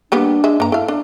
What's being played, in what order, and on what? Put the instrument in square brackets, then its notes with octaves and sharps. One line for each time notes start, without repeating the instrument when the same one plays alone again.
[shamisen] G3 A#3 B3 [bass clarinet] D4
[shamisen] G#3 E5
[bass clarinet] G2 [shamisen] A#3 A#5
[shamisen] E4 F5 [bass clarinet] A4
[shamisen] D4